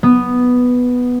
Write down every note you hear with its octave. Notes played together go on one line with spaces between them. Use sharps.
B3